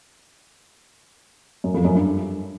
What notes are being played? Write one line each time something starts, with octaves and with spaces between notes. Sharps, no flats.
F#2
F2
F#2
G2